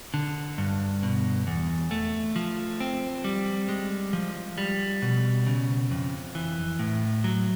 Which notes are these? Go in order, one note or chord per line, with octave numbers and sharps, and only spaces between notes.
D3
G2
B2
E2
A3
F3
C4
G3
G#3
F3
G3
B2
C#3
F2
E3
A2
F#3